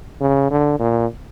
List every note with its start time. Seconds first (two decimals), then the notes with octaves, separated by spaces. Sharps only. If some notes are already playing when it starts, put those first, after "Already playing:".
0.21 C#3
0.51 D3
0.79 A#2